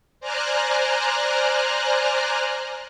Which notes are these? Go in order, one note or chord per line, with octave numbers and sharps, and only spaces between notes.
C5 D5 G#5 A#5 F6 F#6